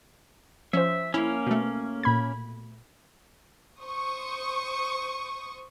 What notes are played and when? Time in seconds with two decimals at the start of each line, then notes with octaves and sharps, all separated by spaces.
0.73 F3 C#4 C5 E5
1.14 A#3 C#4 E4
1.47 B2 A3
2.03 A#2 B5 G#6
3.82 C5 C#6 D#6